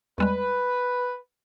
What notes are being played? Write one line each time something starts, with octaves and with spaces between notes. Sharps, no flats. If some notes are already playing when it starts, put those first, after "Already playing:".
E2 G3 G#3 B4